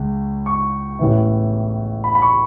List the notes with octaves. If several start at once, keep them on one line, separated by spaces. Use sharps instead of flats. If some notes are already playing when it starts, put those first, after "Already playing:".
Already playing: C#2 C#3
C#6
A1 A2 E3 B3 E4
B5
B5
C#6